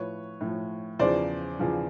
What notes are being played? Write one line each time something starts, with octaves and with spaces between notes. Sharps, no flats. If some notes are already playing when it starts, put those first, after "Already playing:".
Already playing: A2 F3 B4 C#5
A2 F3
E2 C#3 F3 C5 D5
E2 C#3 F3